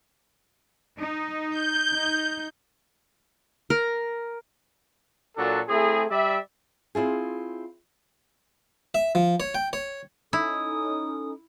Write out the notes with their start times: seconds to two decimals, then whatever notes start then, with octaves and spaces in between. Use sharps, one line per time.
0.97 D#4
1.50 G6
1.95 D#4
3.70 A#4
5.38 A#2 F#3 D4 F#4 A4
5.69 A3 C4 E4 G#4
6.11 G3 D5 E5
6.95 C4 E4 F4 G#4
8.95 E5
9.15 F3
9.40 C#5
9.55 G5
9.73 C#5
10.33 C#4 D#4 E4 A4 D#6